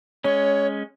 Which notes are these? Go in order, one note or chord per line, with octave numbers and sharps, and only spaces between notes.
G#3 C#4 C#5